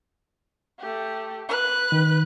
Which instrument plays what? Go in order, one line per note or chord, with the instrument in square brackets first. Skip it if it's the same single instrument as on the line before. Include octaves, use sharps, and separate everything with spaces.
[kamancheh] A3 G4
B4 F#6
[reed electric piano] D#3